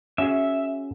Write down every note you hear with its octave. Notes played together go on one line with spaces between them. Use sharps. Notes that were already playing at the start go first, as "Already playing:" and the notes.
C#4 F#4 G#4 E5